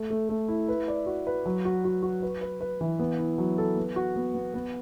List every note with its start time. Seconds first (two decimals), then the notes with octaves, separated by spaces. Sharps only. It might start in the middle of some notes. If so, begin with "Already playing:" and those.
Already playing: A3
0.10 A3
0.29 A3
0.48 E4
0.69 B4
0.88 D5
1.06 F#4
1.27 B4
1.46 F#3
1.65 F#4
1.85 F#4
2.03 F#4
2.23 B4
2.41 B4
2.61 B4
2.81 E3
2.99 B3
3.18 E4
3.38 F#3
3.58 A4
3.77 B3
3.96 F#4
4.16 B3
4.34 B3
4.54 B3